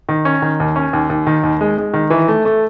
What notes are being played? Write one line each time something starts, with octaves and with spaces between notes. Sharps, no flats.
D#3
C#4
D#3
D#2
C#4
D#2
D#2
D#3
D#2
G#3
G#3
D#3
E3
A3
A3